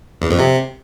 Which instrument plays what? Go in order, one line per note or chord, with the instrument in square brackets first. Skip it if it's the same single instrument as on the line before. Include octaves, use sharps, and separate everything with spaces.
[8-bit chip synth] E2
F2
C3